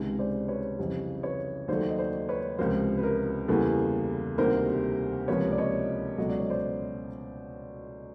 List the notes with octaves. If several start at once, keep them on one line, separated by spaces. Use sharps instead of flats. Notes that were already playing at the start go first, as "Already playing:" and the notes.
Already playing: C#2 C3 D#3 G#3
C5 D5
B4 C#5
F2 C#3 E3 G3
B4 C#5
D#2 D#3 F#3 A3 C5 D5
D#5
C5 D5
B4 C#5
C#2 C3 F3 A#4 C5
B4
A#4
E2 C#3 E3 G3 A#3 A4 B4
D2 C3 D#3 G3 A#3 A#4 C5
C#2 C3 F3 A#3 B4 C#5
D5
C#5 D#5
C#2 B2 F#3 A3 D#5
D5
C#5
C5 D5